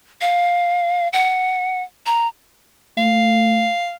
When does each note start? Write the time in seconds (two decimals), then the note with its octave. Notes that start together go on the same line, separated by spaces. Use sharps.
0.21 F5
1.13 F#5
2.06 A#5
2.98 A3 F5